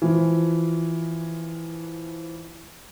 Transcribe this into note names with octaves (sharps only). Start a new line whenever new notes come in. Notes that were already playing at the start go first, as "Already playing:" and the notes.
E3 F3